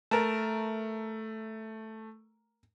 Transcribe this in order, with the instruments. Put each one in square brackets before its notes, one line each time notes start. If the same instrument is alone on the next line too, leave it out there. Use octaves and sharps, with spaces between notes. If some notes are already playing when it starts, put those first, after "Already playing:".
[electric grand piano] A3 [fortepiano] A#4 A5